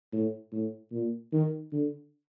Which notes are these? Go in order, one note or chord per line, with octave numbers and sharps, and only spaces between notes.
A2
A2
A#2
D#3
D3